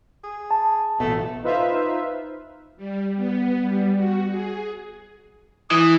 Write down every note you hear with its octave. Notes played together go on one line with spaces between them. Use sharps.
G#4
A5
A1 B2 A3
D#4 F4 B4 C5 E5 F5
G3
B3
G3
F#4
G#4
E3 D#6